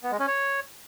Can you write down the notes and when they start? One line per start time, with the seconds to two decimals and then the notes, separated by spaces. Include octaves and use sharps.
0.03 B3
0.11 G#3
0.19 C#4
0.27 C#5